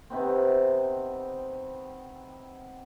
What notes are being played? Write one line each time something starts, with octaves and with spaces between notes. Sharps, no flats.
C3 D#3 B3 C4